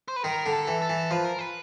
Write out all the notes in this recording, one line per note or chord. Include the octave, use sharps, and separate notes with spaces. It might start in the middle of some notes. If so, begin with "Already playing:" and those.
C5
B4
D#3 A#4
D3
A4
E3
A4
E3
F3 B4
A#4
B4